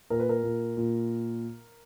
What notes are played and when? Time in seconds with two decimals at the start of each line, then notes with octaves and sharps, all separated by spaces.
0.10 A#2 A#4
0.20 B4
0.29 A#4
0.43 A#2
0.77 A#2